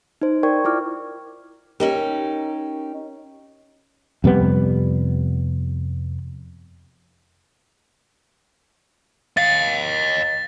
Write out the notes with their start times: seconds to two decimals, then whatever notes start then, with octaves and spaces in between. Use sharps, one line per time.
0.22 D#4 C5
0.43 A#4 D5 G5 C#6 G#6
0.65 E4 F4 D6 F6
1.80 C#4 D#4 G4 A#4
4.24 F2 C3 G3 B3
9.37 D#5 F5 A6